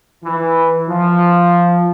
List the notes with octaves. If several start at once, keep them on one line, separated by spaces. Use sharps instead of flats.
E3
F3